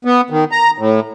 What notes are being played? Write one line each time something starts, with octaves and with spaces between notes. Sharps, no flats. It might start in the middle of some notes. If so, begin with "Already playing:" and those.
B3
D#3
A#5
A2